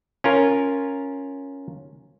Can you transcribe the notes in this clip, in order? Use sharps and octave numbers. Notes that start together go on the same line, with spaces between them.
C#4 F4 A#4